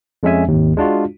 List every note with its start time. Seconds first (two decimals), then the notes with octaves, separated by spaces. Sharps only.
0.23 F2 G#3 C#4 E5 G#5
0.48 G#1 D#2
0.77 G#3 D4 F4 F#4